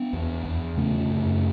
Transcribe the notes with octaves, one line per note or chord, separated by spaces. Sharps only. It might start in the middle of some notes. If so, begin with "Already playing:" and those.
Already playing: B3 D4
E2
E2
C#3 A3 C#4
F#2